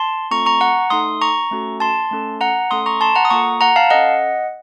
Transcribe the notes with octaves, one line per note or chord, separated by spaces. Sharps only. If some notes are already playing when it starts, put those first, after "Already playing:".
Already playing: A5 C6
A3 C4 F4 A4 A#5 C#6
A#5 C#6
F#5 A#5
A3 D#4 A4 C6 D#6
A#5 C#6
A3 C#4 F#4 A4
A5 C6
A3 C#4 A4
F#5 A#5
A3 C#4 A4 C6 D#6
A#5 C#6
A5 C6
F#5 A#5
D#6
A#3 F4 A4 A#5 C#6
F#5 A#5
F5 A5
C#4 A4 D#5 F#5